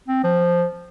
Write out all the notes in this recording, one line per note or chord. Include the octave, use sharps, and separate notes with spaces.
C4
F3